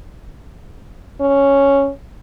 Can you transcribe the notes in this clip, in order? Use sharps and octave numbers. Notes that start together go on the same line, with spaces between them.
C#4